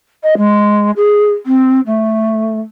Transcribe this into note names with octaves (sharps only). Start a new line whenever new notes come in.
D#5
G#3
G#4
C4
A3